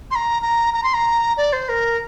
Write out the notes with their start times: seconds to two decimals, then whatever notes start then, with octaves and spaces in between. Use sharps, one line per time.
0.11 C6
0.15 A#5
0.42 A#5
0.74 A#5
0.84 C6
0.94 A#5
1.37 D5
1.53 C5
1.69 A#4